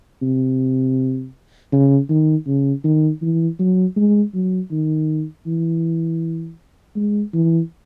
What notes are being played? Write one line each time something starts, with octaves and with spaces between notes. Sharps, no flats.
C3
C#3
D#3
C#3
D#3
E3
F#3
G#3
F#3
D#3
E3
G#3
E3